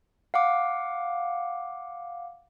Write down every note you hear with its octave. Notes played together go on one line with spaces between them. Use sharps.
F5 F#5 D6